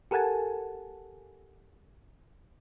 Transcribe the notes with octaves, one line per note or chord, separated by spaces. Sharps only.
G4 A4 A#4 F#5 G#5 A5